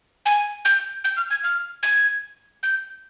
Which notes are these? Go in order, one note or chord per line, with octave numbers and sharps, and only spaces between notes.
G#5
G6
G6
F6
G#6
F6
G#6
G6